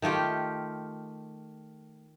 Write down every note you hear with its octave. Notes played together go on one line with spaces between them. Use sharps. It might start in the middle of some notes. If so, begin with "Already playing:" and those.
D#3 A3 F4 G4